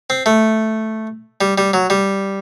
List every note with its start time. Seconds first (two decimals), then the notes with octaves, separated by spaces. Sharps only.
0.10 C4
0.26 A3
1.41 G3
1.58 G3
1.73 F#3
1.90 G3